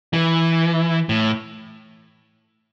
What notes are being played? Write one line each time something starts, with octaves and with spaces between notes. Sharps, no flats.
E3
A2